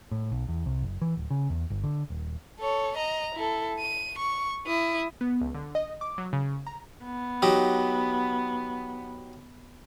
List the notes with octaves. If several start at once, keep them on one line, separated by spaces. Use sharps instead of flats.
A2
B1
E2
C2
F#1
E3
D1
C#3
E2
G1
D3
D#1
A4 C#5
D#5 A#5
E4 A4
D#7
C#6
E4 D#6
B3
C#2
D3
D#5
D6
F#3
C#3
A#5
B3
F#3 D#4 G4